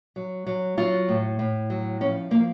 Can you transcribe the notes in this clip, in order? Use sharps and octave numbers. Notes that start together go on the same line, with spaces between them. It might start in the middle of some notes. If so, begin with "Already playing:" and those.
F#3
F#3
F#3 F4
A2
A2
F#3
F3 C#4
F3 A#3